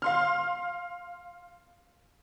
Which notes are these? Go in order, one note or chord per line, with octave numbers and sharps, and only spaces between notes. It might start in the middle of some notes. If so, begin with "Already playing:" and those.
F5 C6 F6